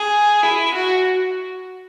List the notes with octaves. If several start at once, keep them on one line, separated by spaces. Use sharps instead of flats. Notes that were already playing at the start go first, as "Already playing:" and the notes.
Already playing: G#4
E4
F#4